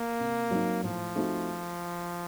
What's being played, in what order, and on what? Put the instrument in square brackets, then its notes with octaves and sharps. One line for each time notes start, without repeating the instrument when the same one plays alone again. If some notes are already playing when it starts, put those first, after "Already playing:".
Already playing: [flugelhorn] A#3
[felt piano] C3
F#3 C4 D#4
[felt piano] A2 [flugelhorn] F3
[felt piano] A3 C4 D#4 F#4